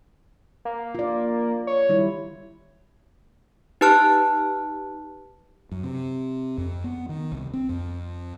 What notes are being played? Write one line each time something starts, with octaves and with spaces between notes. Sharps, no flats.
A#3
F4 D5
C#5
D#3 G3 E4
D#4 G4 B4 A5 F6 F#6
F#2
C3
F2
B3
D#3
C2
C4
F2